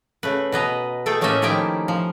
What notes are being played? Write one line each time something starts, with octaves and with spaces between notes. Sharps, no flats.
C#3 A3 B4
B2 B4 D#5 A#5
A3 G#4 A4 G5
A2 A3 A#3 C#4 D#5 E5
D#3 F3 D#4 E4 G4 G5
F3